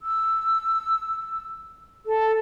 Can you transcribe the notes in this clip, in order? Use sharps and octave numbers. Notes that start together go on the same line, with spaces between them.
E6
A4